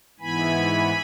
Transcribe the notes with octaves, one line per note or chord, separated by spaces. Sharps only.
G#2 E3 B3 E4 G#5 B5